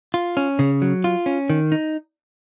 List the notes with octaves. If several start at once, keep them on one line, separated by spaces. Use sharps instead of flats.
F4
C#4
C#3
F#3
F4
C#4
D#3
D#4